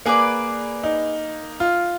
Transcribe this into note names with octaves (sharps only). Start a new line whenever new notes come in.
A#3 G#4 B4 D5
D#4
F4